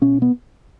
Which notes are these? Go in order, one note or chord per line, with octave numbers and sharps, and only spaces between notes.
B2 C#4
B3